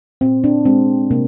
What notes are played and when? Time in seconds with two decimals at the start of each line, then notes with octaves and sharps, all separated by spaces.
0.21 A#2 C4
0.44 D4
0.65 G#3 C4
1.11 C3 A#3